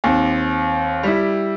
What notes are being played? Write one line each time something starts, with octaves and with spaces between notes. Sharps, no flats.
D#2 C4
G3 E4